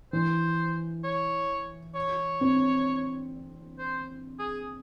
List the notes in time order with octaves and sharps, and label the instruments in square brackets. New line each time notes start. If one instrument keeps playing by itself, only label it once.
[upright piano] E3 [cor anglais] C5
[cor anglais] C#5
C#5
[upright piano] C4
[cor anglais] C5
G#4